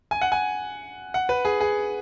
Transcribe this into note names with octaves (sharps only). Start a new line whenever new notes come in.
G#5
F#5
G#5
F#5
B4
G#4
G#4